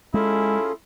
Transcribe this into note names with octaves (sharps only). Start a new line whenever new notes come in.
G#3 C#4 E4 F4 G#4 A4